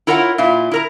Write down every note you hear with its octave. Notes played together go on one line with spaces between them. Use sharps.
E4 F4 A#4 C#5 F5 F#5
A#2 E4 F4
E4 A#4 A#5